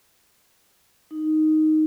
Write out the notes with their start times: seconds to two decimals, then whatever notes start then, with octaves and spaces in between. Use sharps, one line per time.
1.11 D#4